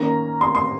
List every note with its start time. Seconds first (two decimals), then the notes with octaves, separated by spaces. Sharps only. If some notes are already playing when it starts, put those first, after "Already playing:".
Already playing: D#3 A#3 C#4 A#5
0.41 C6
0.55 C6